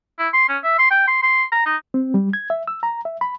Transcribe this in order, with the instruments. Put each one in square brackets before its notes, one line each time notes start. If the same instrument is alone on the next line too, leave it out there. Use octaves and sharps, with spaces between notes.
[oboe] E4
C6
C#4
E5
C6
G5
C6
C6
A#5
D#4
[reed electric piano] C4
G3
G#6
E5
E6
A#5
E5
B5